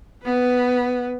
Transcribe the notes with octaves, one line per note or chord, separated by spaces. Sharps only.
B3 B4